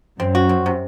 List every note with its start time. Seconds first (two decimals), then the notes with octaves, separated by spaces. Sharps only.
0.19 F#2 C4
0.35 F#4
0.49 C4
0.66 C3